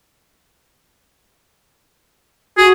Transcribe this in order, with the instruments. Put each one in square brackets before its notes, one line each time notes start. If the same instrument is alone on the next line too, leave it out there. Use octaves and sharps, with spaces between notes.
[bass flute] F#4 [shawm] G#4